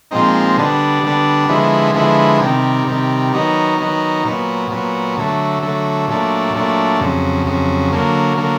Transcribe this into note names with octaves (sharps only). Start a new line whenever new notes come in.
A#2 F3 G#3 C4 D#4
D3 G3 B3 D4
D3 G3 B3 D4
D3 F3 G#3 B3 E4
D3 F3 G#3 B3 E4
C3 D#3 G3
C3 D#3 G3
D#3 F#3 B3 D#4
D#3 F#3 B3 D#4
A#2 F#3 B3
A#2 F#3 B3
D3 F#3 A3
D3 F#3 A3
A#2 F#3 A3 D4
A#2 F#3 A3 D4
F2 C#3 F#3
F2 C#3 F#3
D3 F#3 A#3
D3 F#3 A#3